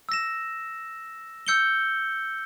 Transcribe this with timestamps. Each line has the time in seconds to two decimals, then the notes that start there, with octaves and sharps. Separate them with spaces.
0.09 E6 A#6 E7
1.47 E6 G6 C#7 G7